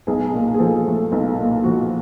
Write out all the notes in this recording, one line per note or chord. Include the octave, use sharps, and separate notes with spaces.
B1 G#4
A#2
G#4
F3 A4
A3
B1
A#2
F3 F#4